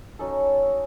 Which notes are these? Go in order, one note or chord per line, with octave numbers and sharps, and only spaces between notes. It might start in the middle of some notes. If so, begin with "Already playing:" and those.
F#3 C#4 D#4 A4